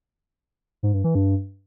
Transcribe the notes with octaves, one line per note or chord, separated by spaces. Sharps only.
G#2
G2
E3
G2